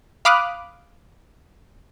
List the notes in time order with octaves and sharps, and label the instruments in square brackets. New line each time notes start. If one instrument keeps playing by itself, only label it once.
[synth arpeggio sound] F5 B5 D6 D#6 F6 F#6